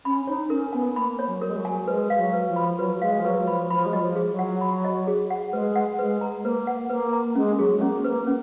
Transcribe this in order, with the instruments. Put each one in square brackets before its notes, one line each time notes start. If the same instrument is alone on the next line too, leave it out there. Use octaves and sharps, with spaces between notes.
[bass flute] C#4 [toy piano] B5
[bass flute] D#4 [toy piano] C#5
[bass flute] C#4 [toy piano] A#4
[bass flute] B3 [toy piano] G#5
[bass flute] A#3 [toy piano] B5
[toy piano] C#5
[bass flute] F#3
[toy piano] A#4
[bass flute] G#3
F#3
[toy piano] G#5
[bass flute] G#3 [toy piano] B4
[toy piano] F5
[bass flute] F#3
[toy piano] B4
[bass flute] F3
[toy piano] B5
[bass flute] F#3 [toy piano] B4
[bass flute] G#3 [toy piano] F5
[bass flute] F3
[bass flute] F#3 [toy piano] B4
[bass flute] F3 [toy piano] B5
[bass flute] F3 [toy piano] B5
[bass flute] G#3
[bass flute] F#3 [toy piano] D#5
[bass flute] F3
[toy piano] G#4
[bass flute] F#3
[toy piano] F#5
B5
D#5
G#4
F#5
[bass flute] G#3 [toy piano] B4
[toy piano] F#5
[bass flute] G#3 [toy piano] B4
[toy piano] A#5
[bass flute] A#3 [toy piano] B4
[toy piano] F#5
[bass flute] A#3 [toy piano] B4
[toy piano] A#5
[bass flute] G#3 [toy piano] C#4
[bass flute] F#3 [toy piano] G#4
[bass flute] G#3
[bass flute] A#3 [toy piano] C#4
[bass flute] A#3 [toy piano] B4
[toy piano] C#4